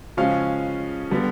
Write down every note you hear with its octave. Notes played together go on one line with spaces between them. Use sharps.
C#3 F3 G#3 C#4 F5
D3 G3 B3